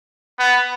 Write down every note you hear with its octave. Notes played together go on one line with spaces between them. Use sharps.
B3